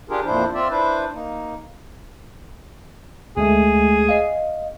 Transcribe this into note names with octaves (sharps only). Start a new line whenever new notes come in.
D4 F4 G4 G#4 A#4
F2 A#2 F3 D4 E4 C5
C4 F4 D5 E5
D4 E4 B4 C5
A#3 D#4
D2 G#3 A3 G#4
D#5 F5